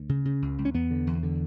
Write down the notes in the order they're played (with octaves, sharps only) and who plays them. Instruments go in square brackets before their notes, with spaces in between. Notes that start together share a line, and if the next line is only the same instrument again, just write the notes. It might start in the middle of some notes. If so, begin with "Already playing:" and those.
Already playing: [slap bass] D2
C#3
C#3
C#2
C#2
C#4
E2 B3
D3
E2
D3